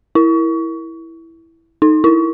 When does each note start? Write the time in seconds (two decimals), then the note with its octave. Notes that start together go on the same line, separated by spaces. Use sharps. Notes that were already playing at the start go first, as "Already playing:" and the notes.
0.15 E4
1.82 D#4
2.04 E4